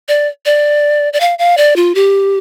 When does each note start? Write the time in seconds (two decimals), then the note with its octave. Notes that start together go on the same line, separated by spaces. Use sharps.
0.08 D5
0.46 D5
1.13 D5
1.20 F5
1.39 F5
1.57 D5
1.76 F4
1.95 G4